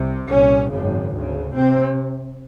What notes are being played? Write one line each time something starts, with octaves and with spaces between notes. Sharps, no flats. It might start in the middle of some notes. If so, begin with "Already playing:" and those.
Already playing: C2 C3
C2 A#2 C#4
G#1 F#2 C#3
D2 C#3
C3 C4